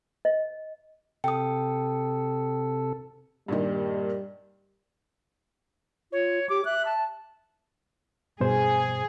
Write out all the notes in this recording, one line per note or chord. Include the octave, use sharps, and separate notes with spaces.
D#5
C3 A4 G5 D#6
G2 A#2 D#3 G3
F4 C#5
G4 D6
E5 F#6
A5
G2 B2 G#4 C5